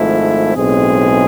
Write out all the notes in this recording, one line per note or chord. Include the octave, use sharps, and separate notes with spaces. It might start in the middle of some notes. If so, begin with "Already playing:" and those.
Already playing: G#1 G#2 F3 A3 E4
B1 A2 G#3 C4 G#4